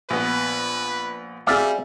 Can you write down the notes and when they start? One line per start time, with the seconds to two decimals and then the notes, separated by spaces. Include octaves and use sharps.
0.10 A#1 B3 B4
1.47 G3 C4 F#4 G#4 D5 E5 F5